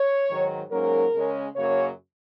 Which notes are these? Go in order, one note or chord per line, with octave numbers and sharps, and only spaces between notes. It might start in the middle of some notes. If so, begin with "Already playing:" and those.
Already playing: C#5
G#2 D#3 F#3
G#2 F#3 A#3 C#4 A#4
C#3 G#3 C#4
F#2 C#3 F#3 A#3 C#4 C#5